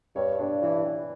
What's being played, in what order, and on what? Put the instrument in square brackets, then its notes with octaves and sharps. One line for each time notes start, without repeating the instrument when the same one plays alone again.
[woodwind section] G2 [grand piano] C#5
[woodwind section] G2 [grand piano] D4
[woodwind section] E3
E3